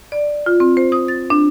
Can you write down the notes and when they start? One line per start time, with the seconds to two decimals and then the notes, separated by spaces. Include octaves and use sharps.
0.12 D5
0.46 F4
0.60 C4
0.77 C5
0.92 D#6
1.08 A6
1.30 D4